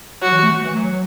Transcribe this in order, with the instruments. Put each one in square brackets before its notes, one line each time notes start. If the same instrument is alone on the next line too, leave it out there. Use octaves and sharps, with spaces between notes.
[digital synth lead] F#3 [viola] F#4
[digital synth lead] E3
A3
A3
E3
F#3